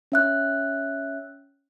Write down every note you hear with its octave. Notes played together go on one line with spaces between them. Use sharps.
C#4 E5 F#6